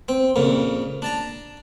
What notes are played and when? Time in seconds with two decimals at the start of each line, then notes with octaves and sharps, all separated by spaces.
0.09 C4
0.36 F2 A#2 C#3
1.02 D4 A5 A#5